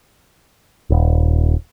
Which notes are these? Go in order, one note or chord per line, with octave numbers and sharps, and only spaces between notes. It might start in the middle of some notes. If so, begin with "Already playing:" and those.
D#1